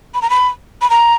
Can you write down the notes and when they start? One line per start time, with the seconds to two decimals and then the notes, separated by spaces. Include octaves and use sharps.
0.14 B5
0.22 A#5
0.30 B5
0.81 B5
0.90 A#5